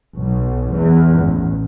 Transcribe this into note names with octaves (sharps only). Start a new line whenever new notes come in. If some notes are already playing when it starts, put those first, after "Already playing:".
B1
E2
A1